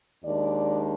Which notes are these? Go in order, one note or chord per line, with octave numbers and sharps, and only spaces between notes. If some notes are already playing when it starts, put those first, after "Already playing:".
D#2 D#3 G#3 D4 D5